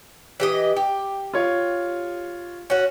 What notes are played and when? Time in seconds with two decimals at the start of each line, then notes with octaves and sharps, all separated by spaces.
0.40 E3 G4 D#5
0.76 G4
1.33 F4 C#5
2.70 C#4 F#4